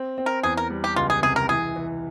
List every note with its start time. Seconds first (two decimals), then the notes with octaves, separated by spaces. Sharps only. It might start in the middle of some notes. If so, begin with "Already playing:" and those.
Already playing: C4
0.18 C4
0.26 A#4
0.43 E2 G#4
0.57 A#4
0.70 G3
0.84 G4
0.96 C#2 F4
1.10 G#4
1.23 C3 G#4
1.36 A#4
1.49 E3 G#4
1.76 E3